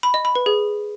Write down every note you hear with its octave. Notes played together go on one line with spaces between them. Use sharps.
B5
D#5
B5
B4
G#4